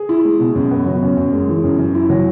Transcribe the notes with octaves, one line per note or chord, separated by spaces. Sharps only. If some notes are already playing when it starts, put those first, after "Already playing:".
Already playing: G#4
E4
G#3
B2
F#2
B3
F#3
F#2
F#2
G#3
E3
F#2
F#2
E4
F#3